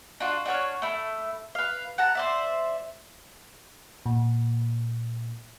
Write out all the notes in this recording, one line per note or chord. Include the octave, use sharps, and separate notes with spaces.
D4 F4 F#4
D4 F#4 C#5 F6
A3 E4
B4 F5
F#5 A5 A#5
C5 D5 E5
A#2